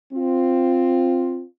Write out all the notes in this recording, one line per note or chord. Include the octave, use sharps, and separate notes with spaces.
C4 F4